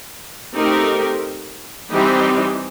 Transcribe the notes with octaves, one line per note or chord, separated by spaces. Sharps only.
A3 C4 D#4 G4 A#4
E3 G3 C4 D#4 G4